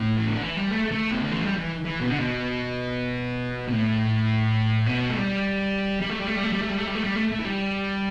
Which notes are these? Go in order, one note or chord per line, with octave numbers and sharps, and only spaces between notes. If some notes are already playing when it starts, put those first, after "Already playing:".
Already playing: A2
E3
D3
E3
G3
A3
A3
B2
D3
E3
G3
E3
E3
B2
D3
B2
B2
A2
B2
A3
G3
G3
A3
G3
A3
G3
A3
G3
A3
G3
A3
G3
A3
G3
A3
A3
E3
G3